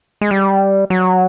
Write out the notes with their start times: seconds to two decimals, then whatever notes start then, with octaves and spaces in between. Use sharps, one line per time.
0.21 G#3
0.31 G3
0.90 F#3